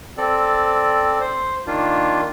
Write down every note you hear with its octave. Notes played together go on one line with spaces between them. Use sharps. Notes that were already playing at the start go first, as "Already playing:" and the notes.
C4 A4 D5
C5
D#3 A#3 D4 F4